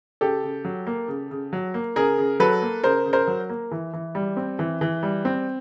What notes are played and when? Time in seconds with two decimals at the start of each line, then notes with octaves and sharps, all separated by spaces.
0.21 C#3 G4 A4
0.43 C#3
0.65 F#3
0.87 A#3
1.08 C#3
1.31 C#3
1.53 F#3
1.74 A#3
1.96 C#3 G#4 A#4
2.18 C#3
2.40 F#3 A4 B4
2.62 A#3
2.83 C#3 A#4 C5
3.06 C#3
3.13 A#4 C5
3.27 F#3
3.49 A#3
3.71 E3
3.93 E3
4.15 G3
4.37 C4
4.59 E3
4.81 E3
5.03 G3
5.25 C4